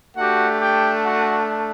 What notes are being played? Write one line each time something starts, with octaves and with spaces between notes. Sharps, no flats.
A3 D4 F#4 G4 F#5
G4 G5
F#4 F#5